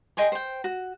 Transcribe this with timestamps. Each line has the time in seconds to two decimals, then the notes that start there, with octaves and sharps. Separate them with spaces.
0.17 D#5 G5 G#5 C6
0.32 C5 G5
0.64 F#4